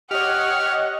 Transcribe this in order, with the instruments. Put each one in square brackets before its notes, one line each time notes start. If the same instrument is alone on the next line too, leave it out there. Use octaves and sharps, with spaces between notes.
[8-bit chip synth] G4 C#5 [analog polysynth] D#5 [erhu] F#5 [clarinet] F6